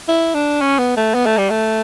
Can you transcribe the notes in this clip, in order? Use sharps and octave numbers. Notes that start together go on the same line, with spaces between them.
E4
D4
C#4
B3
A3
B3
A3
G3
A3